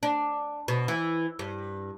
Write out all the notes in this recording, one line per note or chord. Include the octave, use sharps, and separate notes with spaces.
D4
B2
E3
G2